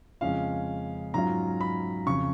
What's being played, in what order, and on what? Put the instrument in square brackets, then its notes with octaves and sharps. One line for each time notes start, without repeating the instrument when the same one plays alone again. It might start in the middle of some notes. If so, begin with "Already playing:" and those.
[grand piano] F2 C#3 G#3 C#4 F4 F5
G#2 F#3 C#4 F4 A#5
B5
F2 C#3 C#6